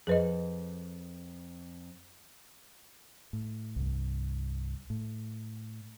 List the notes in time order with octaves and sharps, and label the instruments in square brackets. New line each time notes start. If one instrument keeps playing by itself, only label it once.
[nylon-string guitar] F2 [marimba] G#4 B4 D#5
[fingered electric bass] A2
C2 G2
A2